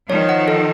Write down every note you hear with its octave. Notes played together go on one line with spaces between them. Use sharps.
D#3 F3 C#5
F#5
A4